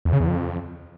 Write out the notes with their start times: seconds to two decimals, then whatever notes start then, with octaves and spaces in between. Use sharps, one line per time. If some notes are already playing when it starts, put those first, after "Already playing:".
0.05 E2
0.13 C#3
0.20 E2
0.28 F2